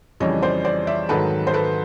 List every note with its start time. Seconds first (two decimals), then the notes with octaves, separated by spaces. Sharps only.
0.20 F2 C#3 E3 G3 C#5 D#5
0.42 C5 D5
0.65 C5 D5
0.87 D5 E5
1.09 G#2 D#3 F#3 A4 B4
1.47 C5
1.54 A4 B4